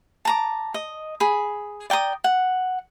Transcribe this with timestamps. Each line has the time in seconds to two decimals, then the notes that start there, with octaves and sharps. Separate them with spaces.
0.25 A5 A#5 D6
0.74 D#5
1.20 G#4 B5
1.90 D5 G5 A#5 D#6
2.24 F#5